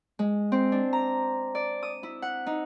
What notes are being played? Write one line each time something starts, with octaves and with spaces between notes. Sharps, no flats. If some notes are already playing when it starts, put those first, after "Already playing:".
G#3
C4
D4
A#5
D5
D#6
E4
F#5
D#4